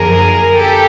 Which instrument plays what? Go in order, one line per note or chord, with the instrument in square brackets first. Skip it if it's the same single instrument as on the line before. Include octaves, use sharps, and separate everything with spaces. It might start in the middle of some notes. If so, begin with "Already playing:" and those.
Already playing: [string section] F#2 D3 F3 A#3 G#4 A#4
G4 A4